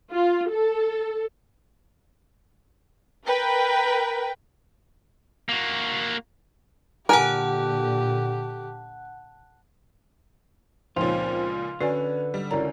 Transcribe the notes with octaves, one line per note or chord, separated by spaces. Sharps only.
F4
A4
A#4 B4 G5
A#3 F#4
A#2 D3 G4 A#4 F#5 G#5 A5 F#6
C#2 A#2 F3 C4 D#4 F4 C#5
D3 C#4 F#4 B4 D5 G#5
G3
C#2 F#2 C#4 E4 D5 A#5